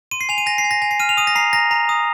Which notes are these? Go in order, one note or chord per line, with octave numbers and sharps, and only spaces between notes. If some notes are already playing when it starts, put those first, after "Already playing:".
C6 D#7
C7
G#5 F7
D#7
G#5 A#6
C7
G#5
A#6
G#5 A#6
C7
F6 D#7
F7
D#6 D#7
A#6
A#5 C7
A#5 A#6
A#5
D#6